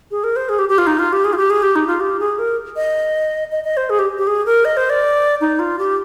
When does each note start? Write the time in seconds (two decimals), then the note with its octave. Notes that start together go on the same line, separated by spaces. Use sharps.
0.11 G#4
0.24 A#4
0.36 C5
0.49 G#4
0.59 G4
0.69 G4
0.78 F4
0.87 D#4
0.99 F4
1.13 G4
1.25 G#4
1.33 F4
1.37 G4
1.50 G#4
1.62 G4
1.76 D#4
1.87 F4
2.00 G4
2.20 G#4
2.39 A#4
2.76 D#5
3.52 D#5
3.64 D#5
3.77 C5
3.90 G#4
3.99 G4
4.18 G4
4.27 G#4
4.46 A#4
4.65 D#5
4.77 C5
4.90 D5
5.41 D#4
5.59 F4
5.79 G4